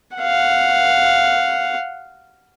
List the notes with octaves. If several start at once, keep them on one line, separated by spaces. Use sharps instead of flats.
F5 F#5